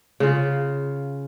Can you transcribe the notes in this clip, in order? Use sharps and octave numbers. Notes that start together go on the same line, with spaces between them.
C#3 F4